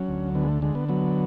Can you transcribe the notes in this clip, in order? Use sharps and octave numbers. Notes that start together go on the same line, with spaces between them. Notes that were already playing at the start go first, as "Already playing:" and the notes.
Already playing: F#3 C#4
D2
D3 B3
G#3
A3
D3 G#3
B3
F#3 B3